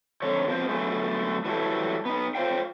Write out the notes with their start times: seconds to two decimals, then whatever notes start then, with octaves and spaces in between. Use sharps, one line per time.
0.22 F2 D3 C#5
0.47 B2 F3 C4 C5
0.69 D3 F#3 A3 B3 G#4
1.45 E3 F#3 G3 E4 A4
2.05 B3 D#4
2.35 F4 C5 C#5 F5 G5